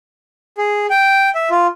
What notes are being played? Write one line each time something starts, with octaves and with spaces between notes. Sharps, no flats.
G#4
G5
E5
F4